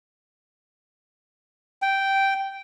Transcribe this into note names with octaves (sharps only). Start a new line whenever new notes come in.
G5